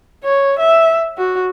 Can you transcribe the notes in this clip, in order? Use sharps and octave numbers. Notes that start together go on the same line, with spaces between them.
C#5
E5
F#4